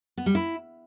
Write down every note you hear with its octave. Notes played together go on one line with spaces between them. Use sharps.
B3
G3
E4